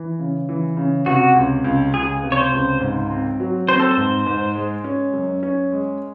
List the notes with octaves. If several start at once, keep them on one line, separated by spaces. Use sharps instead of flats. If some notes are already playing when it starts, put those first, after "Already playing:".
Already playing: E3
C#3
E3
C#3
C3 F#4
C#2
C#2
C#2 G#4
C3
C#5
C5
C#2
G#2
C4
F#3
C4 C5
A4
C5
G#2
G#2
G#3
C#4
F#2
C#4
G#3